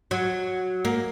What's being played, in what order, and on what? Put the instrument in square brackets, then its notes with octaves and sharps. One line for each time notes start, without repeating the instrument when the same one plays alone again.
[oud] F#3
A#3